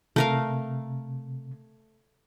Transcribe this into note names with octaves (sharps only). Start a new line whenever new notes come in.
C3 A3 A#4 F5